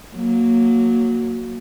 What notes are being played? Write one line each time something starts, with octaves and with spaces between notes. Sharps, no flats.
F#3 A#3